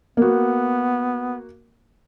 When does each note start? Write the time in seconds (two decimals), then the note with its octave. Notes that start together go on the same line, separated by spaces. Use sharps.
0.17 A#3 B3 F#4